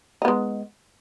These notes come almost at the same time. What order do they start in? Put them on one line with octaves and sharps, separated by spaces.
D#4 B3 G#3